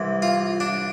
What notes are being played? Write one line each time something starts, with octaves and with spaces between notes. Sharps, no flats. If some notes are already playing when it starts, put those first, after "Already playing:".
Already playing: C2 C3 E3
F4
D4